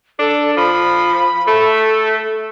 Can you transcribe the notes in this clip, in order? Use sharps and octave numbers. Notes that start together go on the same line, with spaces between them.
D4 A4
F3 B5
A3 A4